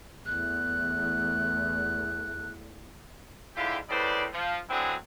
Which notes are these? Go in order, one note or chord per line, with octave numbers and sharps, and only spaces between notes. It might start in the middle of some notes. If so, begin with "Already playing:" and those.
E2 A3 F#6
G#2 D3 E4 F4 G4
A2 C#3 B4 C5 D5
F3
D3 E3 F#3 C4 D4 G#4